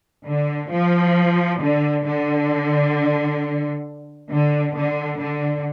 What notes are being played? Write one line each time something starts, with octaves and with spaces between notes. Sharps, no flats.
D3
F3
D3
D3
D3
D3
D3